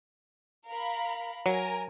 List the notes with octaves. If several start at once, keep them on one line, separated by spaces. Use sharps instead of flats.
A#4 F5 B5
F#3 A#4 G#5 A#5